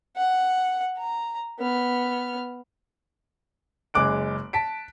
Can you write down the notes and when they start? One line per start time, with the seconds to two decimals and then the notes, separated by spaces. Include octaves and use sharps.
0.16 F#5
0.98 A#5
1.59 B3 F6
3.94 F#1 G#3 D6 F#6 D7
4.53 A5 B6 D7